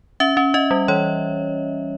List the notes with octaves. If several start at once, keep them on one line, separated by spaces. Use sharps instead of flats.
C#4 E5
C#4
C#4 D#5
G3
E3 C#5